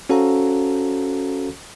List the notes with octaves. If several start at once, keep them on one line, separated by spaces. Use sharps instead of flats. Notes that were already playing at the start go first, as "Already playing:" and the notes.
C#4 F#4 A4 C5 F5 A#5